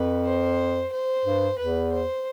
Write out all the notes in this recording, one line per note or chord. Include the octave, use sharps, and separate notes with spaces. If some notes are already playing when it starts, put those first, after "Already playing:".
Already playing: F2 B4
C5
C5
G2
E2 B4
C5